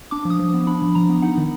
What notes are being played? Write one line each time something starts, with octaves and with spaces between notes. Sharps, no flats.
D4 D6
F3
D#6
F3
B3
D4 B5
F3
F3 A#5
B3
D#4 F#5
D#3